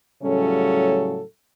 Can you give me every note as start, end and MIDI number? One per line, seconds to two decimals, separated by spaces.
0.23 1.21 45
0.23 1.21 49
0.23 1.21 54
0.23 1.21 55
0.23 1.21 61
0.23 1.21 69